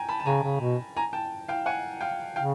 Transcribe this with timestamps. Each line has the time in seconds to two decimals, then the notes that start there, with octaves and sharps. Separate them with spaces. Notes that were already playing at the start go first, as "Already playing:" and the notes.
Already playing: G5 G#5 A#5
0.08 A5 B5
0.20 A5
0.26 C#3 G#5 A#5
0.43 C#3
0.60 B2
0.97 G#5 A#5
1.13 G5 A5
1.48 F5 G5
1.66 F#5 G#5
2.01 F5 G5
2.36 C#3 F5 G5